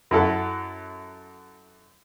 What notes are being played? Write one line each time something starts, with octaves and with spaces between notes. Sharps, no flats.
F#2 E4 A4 F#5